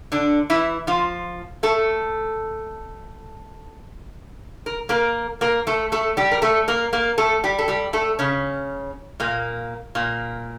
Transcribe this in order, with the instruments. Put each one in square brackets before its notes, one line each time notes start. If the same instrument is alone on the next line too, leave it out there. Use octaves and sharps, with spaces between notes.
[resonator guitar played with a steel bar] D3 D4
E3 E4
F3 F4
A3 A4
A#4
A#3 A#4
A#3 A#4
A3 A4
A3 A4
G3 G4
A#4
A3 A4
A#3 A#4
A#3 A#4
A3 A4
G3 G4
A4
G3 G4
A3 A4
C#3 C#4
A#2 A#3
A#2 A#3